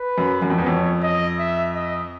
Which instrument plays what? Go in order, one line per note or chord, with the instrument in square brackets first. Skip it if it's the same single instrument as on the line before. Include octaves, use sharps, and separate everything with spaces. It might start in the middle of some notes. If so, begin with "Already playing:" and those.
Already playing: [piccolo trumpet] B4
[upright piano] F#2
F#2
F2
E2
[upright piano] F2 [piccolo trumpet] C#5
[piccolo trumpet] D#5
E5
D#5